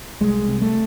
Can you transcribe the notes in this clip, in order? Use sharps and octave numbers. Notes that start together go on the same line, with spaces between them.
C2 G#3
C3
A3